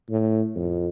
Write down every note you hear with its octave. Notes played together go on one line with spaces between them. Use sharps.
A2
F2